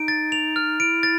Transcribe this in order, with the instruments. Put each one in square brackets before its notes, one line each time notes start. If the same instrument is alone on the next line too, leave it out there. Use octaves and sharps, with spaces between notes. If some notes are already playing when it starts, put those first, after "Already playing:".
Already playing: [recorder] D#4 [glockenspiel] D7
[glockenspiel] A6
F7
F6
[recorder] E4 [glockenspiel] D7
[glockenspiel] A6